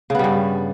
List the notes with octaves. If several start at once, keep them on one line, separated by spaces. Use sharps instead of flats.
G2 C#3 G3 B3